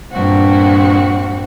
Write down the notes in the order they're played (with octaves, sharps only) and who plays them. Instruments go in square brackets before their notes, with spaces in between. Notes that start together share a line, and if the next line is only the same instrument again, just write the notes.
[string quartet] G2 A#2 C4 F#4